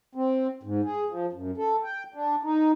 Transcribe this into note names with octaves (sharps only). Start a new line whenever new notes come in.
C4
G#2
G#4
F3
F#2
A4
G5
D4
D#4